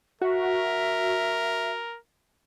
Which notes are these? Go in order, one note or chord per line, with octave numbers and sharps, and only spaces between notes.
F#4 A#4 E5